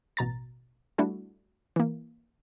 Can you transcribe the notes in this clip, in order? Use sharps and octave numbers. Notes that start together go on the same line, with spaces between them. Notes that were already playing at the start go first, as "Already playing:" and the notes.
A1 B2 A#5 A6
G3 A3 D4 E4 F#4
E3 A#3